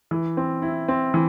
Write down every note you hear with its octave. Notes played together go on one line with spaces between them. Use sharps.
E3
C4
E4
C4
E3